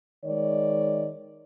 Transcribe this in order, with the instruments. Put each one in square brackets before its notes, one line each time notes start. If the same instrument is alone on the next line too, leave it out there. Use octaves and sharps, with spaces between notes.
[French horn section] D#3 G#3 C#5 D5